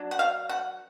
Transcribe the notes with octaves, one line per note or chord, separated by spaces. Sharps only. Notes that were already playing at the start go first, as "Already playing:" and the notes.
Already playing: F#3 D4
F#5
F5
F#5